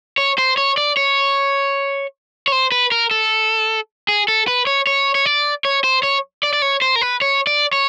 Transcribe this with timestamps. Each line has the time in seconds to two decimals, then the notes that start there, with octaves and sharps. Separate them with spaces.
0.18 C#5
0.38 C5
0.57 C#5
0.77 D5
0.97 C#5
2.48 C#5
2.52 C5
2.72 B4
2.92 A#4
3.11 A4
4.09 G#4
4.28 A4
4.48 B4
4.67 C#5
4.87 C#5
5.15 C#5
5.25 D5
5.65 C#5
5.84 C5
6.03 C#5
6.43 D5
6.53 D5
6.62 C#5
6.82 C5
6.96 A#4
7.01 B4
7.22 C#5
7.47 D5
7.73 C#5